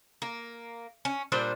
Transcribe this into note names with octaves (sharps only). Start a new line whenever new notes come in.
A#3
C#4
A#2 G3 D4 C5